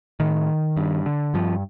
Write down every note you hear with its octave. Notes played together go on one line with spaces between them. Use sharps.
A2 D#3
G2
D3
G2 F3